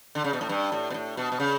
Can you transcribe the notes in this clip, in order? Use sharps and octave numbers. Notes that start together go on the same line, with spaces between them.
D3
C#3
B2
A2
G2
A2
B2
A2
B2
B2
C#3